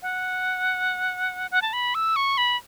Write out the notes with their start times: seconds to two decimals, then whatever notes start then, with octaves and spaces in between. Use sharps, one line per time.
0.02 F#5
1.51 F#5
1.62 A5
1.73 B5
1.95 E6
2.16 C#6
2.38 B5